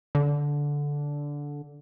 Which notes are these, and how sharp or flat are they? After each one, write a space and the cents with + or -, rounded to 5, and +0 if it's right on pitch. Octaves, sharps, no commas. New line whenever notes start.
D3 -15